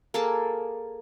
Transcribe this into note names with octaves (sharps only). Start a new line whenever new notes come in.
A#3 G#4 A4 A5